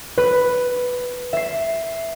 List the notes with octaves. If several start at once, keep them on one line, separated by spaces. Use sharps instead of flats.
B4
E5 C7